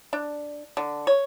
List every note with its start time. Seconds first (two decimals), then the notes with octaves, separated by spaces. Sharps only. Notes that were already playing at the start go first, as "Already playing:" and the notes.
0.13 D4
0.77 D3
1.07 C#5